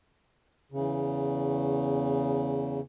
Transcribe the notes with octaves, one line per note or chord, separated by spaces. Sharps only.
E2 C#3